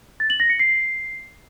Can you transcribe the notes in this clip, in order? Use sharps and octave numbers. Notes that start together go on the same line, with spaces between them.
A6
F#7
A#6
C#7
C7